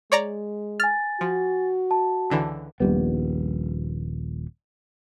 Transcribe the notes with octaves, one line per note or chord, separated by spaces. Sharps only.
G#3 C#5 D5 A#5
G#5 F6 A6
F3 F#4
A5
C#2 D3 E3
D#1 A#1 G3 B3